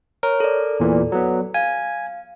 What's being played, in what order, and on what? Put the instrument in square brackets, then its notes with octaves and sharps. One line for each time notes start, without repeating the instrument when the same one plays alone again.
[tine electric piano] A#4 [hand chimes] C#5
[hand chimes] A4 D5
[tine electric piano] E2 A#2 E3
F#3 B3
[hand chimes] F5 [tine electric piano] G#5